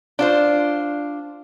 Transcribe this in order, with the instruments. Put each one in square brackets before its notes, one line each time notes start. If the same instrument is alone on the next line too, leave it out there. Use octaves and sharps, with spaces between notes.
[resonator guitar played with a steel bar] D4 F4 C5